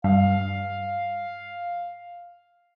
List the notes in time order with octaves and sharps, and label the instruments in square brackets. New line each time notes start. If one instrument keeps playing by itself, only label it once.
[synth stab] G2 [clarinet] F5